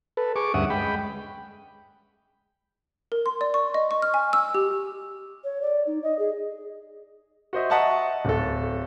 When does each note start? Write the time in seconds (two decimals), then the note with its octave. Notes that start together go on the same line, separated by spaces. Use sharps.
0.17 A4 B4
0.36 G#4 C#6 D6
0.54 D2 G2 C#4 E5 F#5 D#6
0.70 G#3 G5 B5
3.12 A#4
3.26 C6
3.41 D5
3.54 C#6
3.74 D#5
3.91 C#6
4.02 F6
4.14 G#5
4.33 E6
4.55 G4
5.44 C#5
5.62 D5
5.87 D#4
6.03 D#5
6.19 G#4
7.53 F#4 C5 D#5 E5
7.70 D#5 E5 F#5 A5 A#5 C#6
8.25 D1 A4